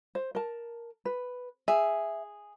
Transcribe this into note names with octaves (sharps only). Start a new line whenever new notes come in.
C5
A#4 A5
B4
G#4 E5